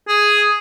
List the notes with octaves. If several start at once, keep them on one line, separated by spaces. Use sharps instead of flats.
G#4